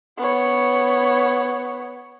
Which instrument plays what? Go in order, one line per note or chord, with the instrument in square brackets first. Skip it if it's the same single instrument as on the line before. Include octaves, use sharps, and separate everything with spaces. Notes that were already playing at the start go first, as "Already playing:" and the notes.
[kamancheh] B3 C#5